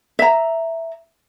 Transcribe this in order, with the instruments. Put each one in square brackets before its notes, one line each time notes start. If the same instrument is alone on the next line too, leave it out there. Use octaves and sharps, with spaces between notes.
[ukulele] E5 A#5